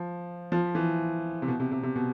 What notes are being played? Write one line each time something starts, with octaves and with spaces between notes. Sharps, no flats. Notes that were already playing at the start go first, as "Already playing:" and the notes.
Already playing: F3
F3
E3
C3
B2
C3
C3
C3
B2